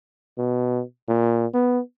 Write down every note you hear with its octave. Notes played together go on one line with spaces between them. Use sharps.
B2
A#2
B3